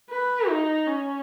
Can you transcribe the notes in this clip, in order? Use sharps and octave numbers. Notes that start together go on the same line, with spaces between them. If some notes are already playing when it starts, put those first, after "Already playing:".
B4
D#4
C#4